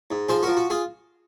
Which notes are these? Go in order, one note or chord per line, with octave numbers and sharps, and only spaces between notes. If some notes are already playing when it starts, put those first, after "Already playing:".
G#2
F3 G#4 C5
F3 F#4 A#4
F#4
F4 G#4